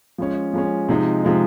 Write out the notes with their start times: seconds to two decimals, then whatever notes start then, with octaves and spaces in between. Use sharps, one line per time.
0.18 F3 G#3 C#4
0.53 F3 G#3 C#4
0.89 C3 F3 G#3 D#4
1.24 C3 F3 G#3 D#4